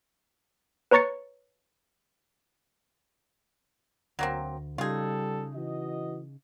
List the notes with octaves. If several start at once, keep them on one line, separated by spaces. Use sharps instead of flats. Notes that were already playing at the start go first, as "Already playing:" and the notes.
B4 C#5 A#5 C#6 A6 C#7
D2 F#3 A#3 C4
C#3 G3 D#4 F4 G#4 A4
E3 F#4 D#5